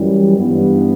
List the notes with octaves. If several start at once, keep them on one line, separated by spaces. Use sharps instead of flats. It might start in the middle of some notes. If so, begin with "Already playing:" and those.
Already playing: F#2 E3 G3
G2 E3 G3 B3